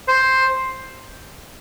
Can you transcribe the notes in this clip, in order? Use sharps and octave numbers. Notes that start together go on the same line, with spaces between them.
C5